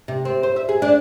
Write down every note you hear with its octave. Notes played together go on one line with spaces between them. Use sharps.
C3
C4
C5
E5
G#4
D4